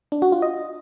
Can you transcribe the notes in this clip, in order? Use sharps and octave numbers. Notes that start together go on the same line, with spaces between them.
D4
F#4
F4
D#5